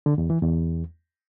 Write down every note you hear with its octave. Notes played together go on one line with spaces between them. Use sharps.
D3
E2
E3
E2